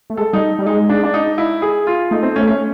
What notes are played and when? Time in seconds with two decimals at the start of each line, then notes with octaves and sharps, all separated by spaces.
0.10 A3
0.17 G#3 A4
0.33 G3 D#4
0.59 G3
0.66 G#3 D#4
0.89 D4
1.04 D4
1.14 D#4
1.38 E4
1.62 G#4
1.87 F4
2.11 A3 D#4
2.23 C4
2.36 C#4
2.47 C#4